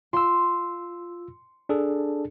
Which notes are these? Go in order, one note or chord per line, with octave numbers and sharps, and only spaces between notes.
F4 C6 E6
D4 G#4 A4